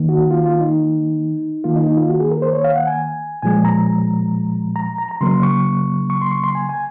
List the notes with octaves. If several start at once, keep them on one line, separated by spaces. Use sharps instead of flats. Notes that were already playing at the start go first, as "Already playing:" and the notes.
Already playing: D#3 A#3
F#4
F4
F4
D#4
D#3 A#3 F4
D#4
D#4
F4
F#4
G#4
A#4
C5
C#5
F5
F#5
G#5
A#2 F3 G#3 G#5
A#5
A#5
A#5
A#5
C#3 F#3 A#3 C6
C#6
C#6
C6
C#6
C6
G#5
G#5